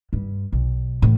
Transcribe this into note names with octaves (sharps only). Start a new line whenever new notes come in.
G2
B1
A2 E3